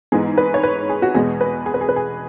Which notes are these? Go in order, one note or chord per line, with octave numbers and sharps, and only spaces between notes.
G#2 E3 G#3 B3 G#4
B4
C#5
B4
G#4
F#4
E2 B2 G#3 B3 G#4
B4
G#4
B4
G#4
B4
G#4